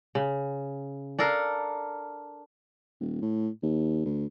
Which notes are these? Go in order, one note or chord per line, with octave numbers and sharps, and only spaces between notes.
C#3
D4 A4 A#4 F5
D#1
A2
D#2
D2